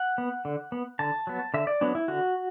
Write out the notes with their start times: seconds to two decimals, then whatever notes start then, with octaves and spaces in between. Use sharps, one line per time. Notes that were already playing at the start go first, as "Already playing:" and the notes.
Already playing: F#5
0.18 B3
0.45 D3
0.72 B3
0.99 D3 A5
1.27 F#3 B3
1.54 D3 E5
1.67 D5
1.81 F#3 B3 D4
1.95 E4
2.08 D3 F#4